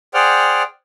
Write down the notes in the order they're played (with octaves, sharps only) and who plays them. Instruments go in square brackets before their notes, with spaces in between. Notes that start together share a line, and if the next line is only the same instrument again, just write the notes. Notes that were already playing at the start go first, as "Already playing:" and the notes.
[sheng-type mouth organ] G#4 C5 D5 F#5 G5 F6